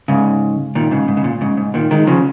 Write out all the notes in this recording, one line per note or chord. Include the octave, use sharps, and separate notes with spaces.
G#2 C#3
A#2 D#3
G#2 C#3
G#2
C#3
A#2
G#2 C#3
G#2
A#2 D#3
D#3 G#3
C#3 F3